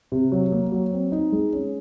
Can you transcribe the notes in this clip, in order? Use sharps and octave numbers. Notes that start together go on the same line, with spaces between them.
C3
F#3
A#3
F#3
C4
D#4
G#3
C#4